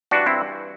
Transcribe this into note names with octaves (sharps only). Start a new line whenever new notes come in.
G2 E3 D4 F#4
C4 E4